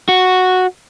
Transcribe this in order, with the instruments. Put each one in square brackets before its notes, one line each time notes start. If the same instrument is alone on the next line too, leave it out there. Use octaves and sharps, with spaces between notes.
[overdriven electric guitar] F#4